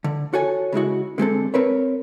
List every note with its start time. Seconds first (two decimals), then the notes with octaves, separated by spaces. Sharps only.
0.04 D3
0.34 F#4 A4 C#5 G#5
0.72 C#3 G#3 E4 F#4
1.18 D3 G#3 C4 A4
1.54 C4 A#4 B4 C#5